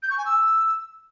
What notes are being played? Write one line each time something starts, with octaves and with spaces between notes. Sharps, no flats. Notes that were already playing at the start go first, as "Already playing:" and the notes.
G6
C#6
G#5
E6